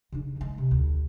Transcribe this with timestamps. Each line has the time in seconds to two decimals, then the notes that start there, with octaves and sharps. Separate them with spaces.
0.12 C#3 D#4
0.36 C#3 G#3
0.58 C3
0.71 D2